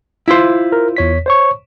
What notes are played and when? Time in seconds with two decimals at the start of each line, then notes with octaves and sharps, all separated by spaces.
0.28 E4 F4 C5
0.72 A#4
0.97 E2 C#5 B6
1.26 C5 C#5 C#6